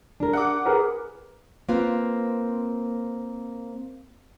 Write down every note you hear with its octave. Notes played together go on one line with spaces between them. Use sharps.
D4 A#4
F#5 D6
G#4 A#4 B4
A#3 C4 F4 B4 F5